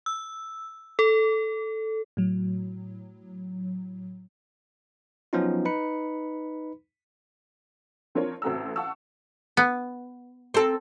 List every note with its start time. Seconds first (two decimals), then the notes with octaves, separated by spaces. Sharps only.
0.06 E6
0.99 A4
2.17 A2 F#3
5.33 F3 F#3 B3 C#4 D#4 F4
5.65 D#4 B4 B5 C#7
8.15 F3 C4 D4 F4 A#4 C#5
8.42 A1 C4 F#4 A4 A#5 E6
8.76 F5 F#5 A5 C#6 E6
9.57 B3
10.54 C4 A4